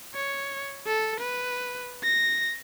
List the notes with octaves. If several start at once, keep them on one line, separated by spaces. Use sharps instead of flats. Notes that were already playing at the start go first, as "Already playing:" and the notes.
C#5
A4
B4
A#6